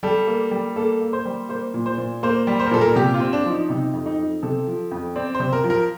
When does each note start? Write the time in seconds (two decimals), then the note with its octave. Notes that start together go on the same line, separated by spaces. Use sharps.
0.03 G3 A4
0.27 A#3
0.51 G3
0.76 A#3 A4
1.01 A#3
1.13 C5
1.25 G3
1.49 A#3 C5
1.74 A#2
1.86 C5
1.98 A#2
2.23 A#3 C5
2.47 G3
2.60 C5
2.66 A#4
2.71 A#2 A4
2.81 A#4
2.96 C3 G4
3.14 F4
3.20 C4
3.33 D4
3.45 F3
3.51 D#4
3.69 C3 D#4
3.93 F2
4.06 D#4
4.19 F2
4.42 C3 A4
4.67 F3
4.91 F2
5.16 C4 D5
5.35 C5
5.40 C3
5.53 A#4
5.64 F3
5.70 A#4